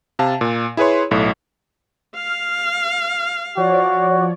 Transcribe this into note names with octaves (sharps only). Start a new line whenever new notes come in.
C3 F5 A5
A#2
E4 G#4 B4 C#5 C6
B1 A2
F5 F6
F3 F#4 C#5 D5